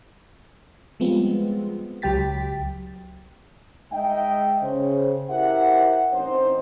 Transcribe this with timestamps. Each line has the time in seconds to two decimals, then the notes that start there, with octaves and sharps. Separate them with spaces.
1.00 F3 G3 G#3 B3 C4 F4
2.02 C#2 F#3 G4 G5 A6 B6
3.92 G#3 D#4 D#5 E5 G5
4.62 C#3 C5
5.30 E4 G4 A#4 C5 E5 F#5
6.13 A1 E3 C4 D#4 C5